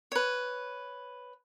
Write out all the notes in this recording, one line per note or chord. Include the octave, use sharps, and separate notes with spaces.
B4 C#5